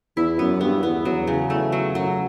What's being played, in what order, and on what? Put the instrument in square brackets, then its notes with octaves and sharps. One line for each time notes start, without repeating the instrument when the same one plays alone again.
[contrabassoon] E2 [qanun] E4
[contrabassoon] F#2 [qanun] B3
[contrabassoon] G2 [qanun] B3
[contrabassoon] E2 [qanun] B3
[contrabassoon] E2 [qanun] F#3
[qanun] C#3
[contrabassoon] E2 [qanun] A3
[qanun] F#3
[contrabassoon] F#2 [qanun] F#3